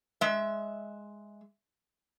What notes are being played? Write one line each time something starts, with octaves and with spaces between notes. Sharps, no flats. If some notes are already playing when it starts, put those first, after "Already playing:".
G#3 E5